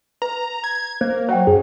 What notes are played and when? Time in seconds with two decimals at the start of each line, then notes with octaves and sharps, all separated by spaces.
0.22 B4 A#5
0.64 G#6
1.01 A#3 C5
1.29 F#3 C5 F#5 G5
1.47 F#2 G#4